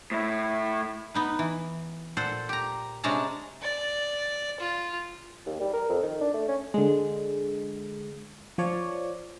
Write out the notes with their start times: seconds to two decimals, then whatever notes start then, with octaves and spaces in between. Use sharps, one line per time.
0.11 A2 E4
1.14 B3 D#4 B4
1.39 E3
2.17 A#2 A4 C5 F#5
2.49 G4 A#5
3.04 C3 G#3 C#4 D4 A5 A#5
3.62 D5
4.60 F4
5.46 D#2
5.60 G3
5.73 A#4
5.89 F2
6.02 D#3
6.21 D4
6.34 A3
6.48 C#4
6.74 D3 G#3
8.58 F3 F4 C#5 D5